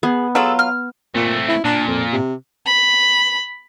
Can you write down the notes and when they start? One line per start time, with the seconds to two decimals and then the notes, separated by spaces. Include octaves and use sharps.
0.03 B3 G#4
0.35 F#3 F4 G#4 A4 E6
0.59 F6
1.15 A#2 A3 C4
1.48 E4
1.64 A#2 D4
1.87 F2
2.12 C3
2.66 B5